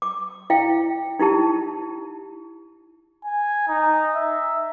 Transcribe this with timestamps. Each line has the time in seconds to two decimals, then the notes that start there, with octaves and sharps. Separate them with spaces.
0.02 D6
0.50 E4 F5 G5
1.19 D#4 E4 G4 A5
3.24 G#5
3.68 D#4
4.16 E5